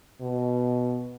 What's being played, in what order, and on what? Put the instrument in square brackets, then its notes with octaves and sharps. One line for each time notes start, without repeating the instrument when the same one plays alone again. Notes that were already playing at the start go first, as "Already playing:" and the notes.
[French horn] B2